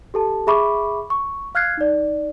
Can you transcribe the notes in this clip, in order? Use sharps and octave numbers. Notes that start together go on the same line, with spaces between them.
G4 A4 A5
G#4 E5 B5 C#6 D6
C#6
F5 F6 F#6 G#6 C7
D#4 D5